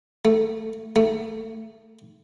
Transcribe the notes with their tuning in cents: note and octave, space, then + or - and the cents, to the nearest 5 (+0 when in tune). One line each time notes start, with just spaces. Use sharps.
A3 +15
A3 +25